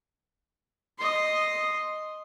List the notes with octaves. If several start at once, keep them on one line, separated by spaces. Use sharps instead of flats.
D#5 C6